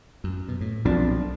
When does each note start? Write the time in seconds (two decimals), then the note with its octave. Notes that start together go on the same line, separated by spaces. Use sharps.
0.24 F#2
0.48 B2
0.61 A2
0.85 B1 F2 A#2 F3 D4